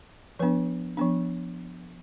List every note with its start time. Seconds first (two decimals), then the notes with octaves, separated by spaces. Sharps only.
0.39 F3 B3 D4 B4
0.97 F3 B3 D4